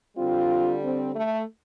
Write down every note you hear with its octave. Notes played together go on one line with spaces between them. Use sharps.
D3 G3 C4 F4
C4
A3